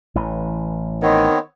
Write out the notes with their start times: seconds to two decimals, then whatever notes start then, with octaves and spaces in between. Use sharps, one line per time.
0.15 A1 E3
1.02 D#3 B3 C4 C#5